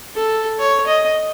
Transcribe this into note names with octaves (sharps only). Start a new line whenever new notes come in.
A4
C#5
D#5